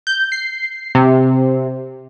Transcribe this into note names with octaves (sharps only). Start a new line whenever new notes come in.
G6
C7
C3